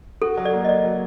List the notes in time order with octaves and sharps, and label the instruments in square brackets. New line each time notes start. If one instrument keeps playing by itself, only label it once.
[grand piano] F#4 [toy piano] A4
[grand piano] F#3
[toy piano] D5
[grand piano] A#3
[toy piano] D#5
[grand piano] F#3 [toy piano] D5
[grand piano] F#3